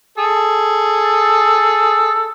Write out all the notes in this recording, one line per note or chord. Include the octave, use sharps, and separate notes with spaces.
G#4 A4